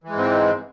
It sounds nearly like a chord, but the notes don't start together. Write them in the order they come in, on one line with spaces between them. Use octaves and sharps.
E3 G#3 G#2 C4